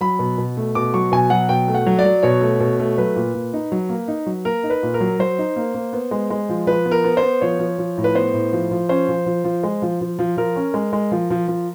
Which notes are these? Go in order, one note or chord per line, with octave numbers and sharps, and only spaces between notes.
F#3 B5
B2
B2
A3
B2 D6
F#3 C#6
B2 G#5
F#3 F#5
B2 G5
A3
F#5
F#3
D5
F#3
B2 C#5
A3
B2
A3
F#3 B4
A#2
A#2
D#4
F#3
A#3
D#4
F#3
A#3 A#4
D#4
B4
A#2
A#4
F#3
F#3 C5
D#4
A#3
A#3
B3
G#3
G#3
F3
F3 B4
B3
A#4
B3
C5
B3
F3 C#5
F3
F3
A2
B4
B3 C5
A2
F3
F3
C#4 C5
F3
F3
F3
G#3
F3
F3
F3
F3 A#4
C#4
G#3
G#3
F3
F3
F3